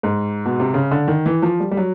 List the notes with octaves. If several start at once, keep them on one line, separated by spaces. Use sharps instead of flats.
G#2
B2
C3
C#3
D3
D#3
E3
F3
G3
G3
F#3